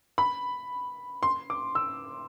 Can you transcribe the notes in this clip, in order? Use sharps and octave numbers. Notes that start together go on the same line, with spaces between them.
B5
C6
D6
E6